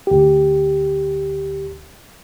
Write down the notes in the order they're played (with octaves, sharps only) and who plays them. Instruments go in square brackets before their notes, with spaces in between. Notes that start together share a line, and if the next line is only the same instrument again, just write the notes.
[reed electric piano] D2 G4